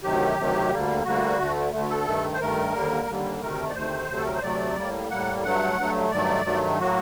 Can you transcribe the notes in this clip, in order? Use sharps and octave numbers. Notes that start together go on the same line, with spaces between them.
D2 C3 D#3 F#3 G4
D2 C3 D#3 F#3
D2 D3 G3 A#3
D2 D3 G3 A#3 F#4
D2 D3 A3
D2 D3 A3
A4
G2 D#3 A3
C5
G2 D#3 A3 A#4
D#2 D3 G3 A#3
D#2 D3 G3 A#3
D2 C3 D#3 A3 A#4
D5
D2 C3 D#3 A3 C5
D2 C3 F#3 A3
A4
A#4
C5
D2 C3 F#3 A3 D5
A2 G3 A#3
A2 G3 A#3 F#5
G2 F#3 A3 F#5
G2 F#3 A3
G2 D#3 F#3 A3 D5
G2 D#3 F#3 A3
A2 F#3 A#3 F#4